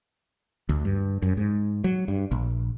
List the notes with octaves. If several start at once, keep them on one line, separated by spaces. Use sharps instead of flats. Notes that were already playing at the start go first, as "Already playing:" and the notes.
D2
G2
F#2
G#2
F#3
G2
A#1